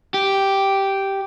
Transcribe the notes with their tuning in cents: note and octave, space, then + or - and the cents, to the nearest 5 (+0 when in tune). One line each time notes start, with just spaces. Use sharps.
G4 -5